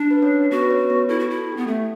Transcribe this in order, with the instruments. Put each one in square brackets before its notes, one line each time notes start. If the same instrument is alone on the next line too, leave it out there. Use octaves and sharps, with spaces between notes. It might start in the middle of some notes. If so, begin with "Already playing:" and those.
Already playing: [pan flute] D4
[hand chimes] B4
C#4 C#5
[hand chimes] B3 B4 [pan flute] F#4
[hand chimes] B4
C#4 C#5
B3 B4
[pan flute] E4 [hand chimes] A4
[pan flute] F#4
E4
[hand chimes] A4
[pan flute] B3 [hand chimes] G4
[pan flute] A3 [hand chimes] A4